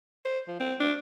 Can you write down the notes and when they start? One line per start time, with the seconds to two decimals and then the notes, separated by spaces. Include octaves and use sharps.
0.25 C5
0.48 F3
0.60 C4
0.80 D4